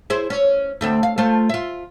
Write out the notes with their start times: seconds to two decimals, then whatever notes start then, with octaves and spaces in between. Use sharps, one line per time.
0.10 E4 G#4 C5
0.30 C#4
0.81 D2 A3 C4
1.03 F5
1.18 A3 F4 C5
1.49 F4 E5